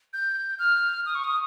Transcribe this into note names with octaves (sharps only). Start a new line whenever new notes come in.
G6
F6
D#6
C#6
D#6